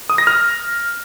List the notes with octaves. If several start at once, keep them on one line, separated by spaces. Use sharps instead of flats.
D#6
A#6
F6